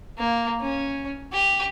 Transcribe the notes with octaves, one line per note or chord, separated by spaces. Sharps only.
A#3
C#4
G4